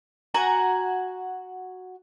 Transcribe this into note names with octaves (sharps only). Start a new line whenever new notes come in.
F#4 F#5 G#5 A#5